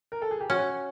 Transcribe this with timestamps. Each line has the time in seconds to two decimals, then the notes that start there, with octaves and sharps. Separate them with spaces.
0.12 A#4
0.22 A4
0.31 G#4
0.40 G4
0.50 C#4 F#4